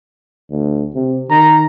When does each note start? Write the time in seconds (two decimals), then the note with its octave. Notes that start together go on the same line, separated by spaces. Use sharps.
0.50 D2
0.95 C3
1.30 D#3 A#5